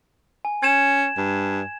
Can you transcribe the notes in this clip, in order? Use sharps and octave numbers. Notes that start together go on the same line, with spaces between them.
G#5
C#4 G#6 E7
G2